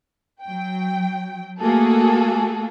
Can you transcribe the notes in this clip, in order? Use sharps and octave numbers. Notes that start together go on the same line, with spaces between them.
F#3 G5
A3 A#3 F#4 G#4 A4